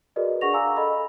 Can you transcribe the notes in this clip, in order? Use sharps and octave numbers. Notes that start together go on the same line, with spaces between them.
F#4 G#4 A#4 B4 D5 D#5
D4 G#4 F#5 C#6 A#6 F7
F5 G#5 A#5 D6 E6
A4 D#5 B5 E6